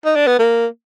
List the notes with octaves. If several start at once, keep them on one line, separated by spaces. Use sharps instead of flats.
D#4
D4
B3
A#3